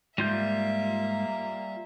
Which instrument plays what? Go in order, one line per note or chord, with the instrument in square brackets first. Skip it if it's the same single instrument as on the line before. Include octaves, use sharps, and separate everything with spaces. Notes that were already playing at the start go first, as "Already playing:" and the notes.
[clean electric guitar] G#2 [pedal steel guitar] G3 F4 G6 [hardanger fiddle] A#3 E5